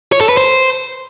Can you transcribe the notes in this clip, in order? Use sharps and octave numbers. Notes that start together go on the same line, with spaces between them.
C#5
A4
B4
C5